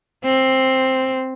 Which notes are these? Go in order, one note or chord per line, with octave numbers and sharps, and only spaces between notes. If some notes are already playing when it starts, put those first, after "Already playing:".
C4